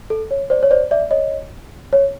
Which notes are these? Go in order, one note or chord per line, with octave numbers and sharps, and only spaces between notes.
A4
C#5
C5 D5
C#5
C5 D5
D5 E5
C#5 D#5
C#5